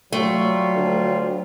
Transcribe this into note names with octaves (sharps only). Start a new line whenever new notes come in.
F#3 G3 A3 F4
D2